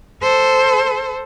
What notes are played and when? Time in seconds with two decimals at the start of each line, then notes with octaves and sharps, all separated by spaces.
0.22 A4 C5